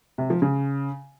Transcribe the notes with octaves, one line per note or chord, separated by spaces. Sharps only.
C3
F3
C#3